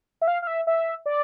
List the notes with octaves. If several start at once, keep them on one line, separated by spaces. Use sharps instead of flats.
E5
F5
F5
E5
E5
D5